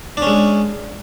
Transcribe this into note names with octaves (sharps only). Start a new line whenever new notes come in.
G#3 C#4 D4